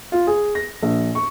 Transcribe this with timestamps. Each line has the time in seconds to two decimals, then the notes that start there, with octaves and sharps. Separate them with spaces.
0.12 F4
0.27 G#4
0.55 A#6
0.83 A#1
1.15 C#6